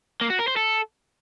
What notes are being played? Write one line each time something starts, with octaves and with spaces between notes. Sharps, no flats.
A#3
F#4
A#4
C5
A4